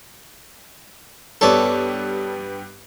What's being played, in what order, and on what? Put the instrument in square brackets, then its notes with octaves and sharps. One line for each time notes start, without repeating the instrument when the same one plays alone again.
[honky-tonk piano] G2 G3 B3 [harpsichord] A4 C#5 D5